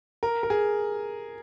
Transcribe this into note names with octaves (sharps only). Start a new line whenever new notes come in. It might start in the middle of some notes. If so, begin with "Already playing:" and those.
A#4
A#4
G#4